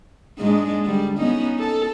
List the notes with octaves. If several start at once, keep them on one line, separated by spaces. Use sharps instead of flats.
G#2 G#3 D4
D3 G3
B3 C#4 D#4
A4